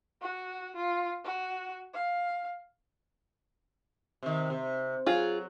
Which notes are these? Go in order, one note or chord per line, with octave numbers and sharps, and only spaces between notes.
F#4
F4
F#4
F5
C3 D#3
C3
F#3 F4 G#4